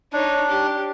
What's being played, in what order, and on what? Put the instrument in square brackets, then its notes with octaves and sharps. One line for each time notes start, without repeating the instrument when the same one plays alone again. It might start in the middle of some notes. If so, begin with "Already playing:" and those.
[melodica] D4 [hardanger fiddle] D#4 C#5
[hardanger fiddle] G4